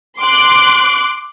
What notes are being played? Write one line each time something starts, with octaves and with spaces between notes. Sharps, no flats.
C6 D6 F#6